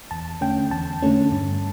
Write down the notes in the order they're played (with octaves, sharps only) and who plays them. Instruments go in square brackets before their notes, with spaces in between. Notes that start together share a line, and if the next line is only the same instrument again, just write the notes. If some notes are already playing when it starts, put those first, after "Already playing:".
[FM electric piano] E2 A5
D3 A3 C#4 G5
E2 A5
D3 A3 C#4
G2